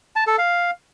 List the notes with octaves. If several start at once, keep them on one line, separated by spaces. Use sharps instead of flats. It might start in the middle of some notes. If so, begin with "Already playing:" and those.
A5
A4
F5